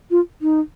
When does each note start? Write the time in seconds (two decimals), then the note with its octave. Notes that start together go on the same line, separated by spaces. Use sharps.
0.11 F4
0.42 D#4